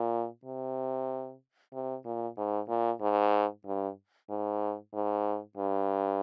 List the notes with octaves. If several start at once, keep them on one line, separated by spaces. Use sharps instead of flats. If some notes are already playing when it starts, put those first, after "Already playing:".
Already playing: A#2
C3
C3
A#2
G#2
A#2
G#2
G2
G#2
G#2
G2